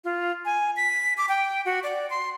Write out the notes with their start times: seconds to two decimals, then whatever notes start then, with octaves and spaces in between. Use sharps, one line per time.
0.04 F4
0.45 G#5
0.77 B6
1.18 D6
1.29 G5
1.65 F#4
1.83 D5
2.10 C6